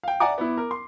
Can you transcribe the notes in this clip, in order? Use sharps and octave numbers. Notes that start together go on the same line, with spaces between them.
F5 G5
D5 E5 F#5 G#5 A#5 D6
B3 E4
A#4
C6